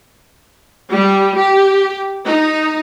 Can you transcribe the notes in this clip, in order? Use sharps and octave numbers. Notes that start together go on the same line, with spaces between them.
G3
G4
D#4